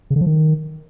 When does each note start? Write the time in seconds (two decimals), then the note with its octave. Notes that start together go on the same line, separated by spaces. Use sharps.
0.10 C#3
0.16 D3
0.21 F3
0.26 D#3